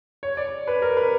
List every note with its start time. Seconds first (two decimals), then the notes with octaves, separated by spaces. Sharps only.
0.23 C#5
0.37 D5
0.67 B4
0.82 A#4
0.97 B4